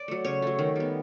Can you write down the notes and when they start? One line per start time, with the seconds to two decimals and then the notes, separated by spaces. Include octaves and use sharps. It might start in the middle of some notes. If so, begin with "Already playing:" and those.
Already playing: D5
0.08 F#3 A3
0.25 C#3 C#5
0.42 F#3 A3
0.59 D#3
0.76 G3 B3